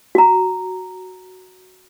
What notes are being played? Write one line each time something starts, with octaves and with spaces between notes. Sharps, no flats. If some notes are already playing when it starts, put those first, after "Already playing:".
F#4 A#5